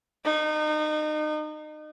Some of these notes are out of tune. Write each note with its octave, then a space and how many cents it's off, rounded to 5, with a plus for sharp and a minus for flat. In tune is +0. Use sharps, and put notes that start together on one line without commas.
D#4 -30